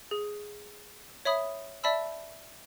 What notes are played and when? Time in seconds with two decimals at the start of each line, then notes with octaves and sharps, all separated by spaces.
0.11 G#4
1.25 C#5 E5 B5 D#6
1.84 D5 E5 A5 B5 E6